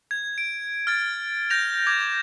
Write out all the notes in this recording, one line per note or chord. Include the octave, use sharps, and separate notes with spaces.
G#6
D7
F6 A6
G6 A#6 F7
D6 G#6